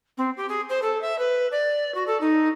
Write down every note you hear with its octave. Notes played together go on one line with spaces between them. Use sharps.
C4
G4
G#4
C5
A4
E5
B4
D5
F#4
A4
D#4